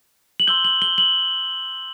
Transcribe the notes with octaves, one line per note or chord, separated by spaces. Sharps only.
F#7
C6 E6 G6 G7
F#7
G7
F#7